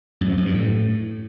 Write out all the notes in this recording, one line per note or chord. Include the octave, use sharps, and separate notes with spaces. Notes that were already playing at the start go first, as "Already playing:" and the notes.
F#2
F3
F#2
G2
A2